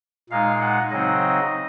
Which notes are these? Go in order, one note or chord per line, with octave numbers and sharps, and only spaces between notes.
A#2 G#3 D#4 F5
F#5
C#3 F#3 C4 D#4 D#5